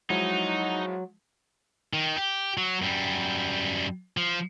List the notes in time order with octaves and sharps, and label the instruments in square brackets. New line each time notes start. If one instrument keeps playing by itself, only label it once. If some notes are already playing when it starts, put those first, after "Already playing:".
[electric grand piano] F3 G#3 E4 [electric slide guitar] F#3 [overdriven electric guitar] D#4 [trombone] F#4
[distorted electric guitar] D#3
G4
F#3
F#2 G3
F3